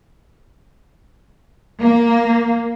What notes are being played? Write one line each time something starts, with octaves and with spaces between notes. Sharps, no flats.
A#3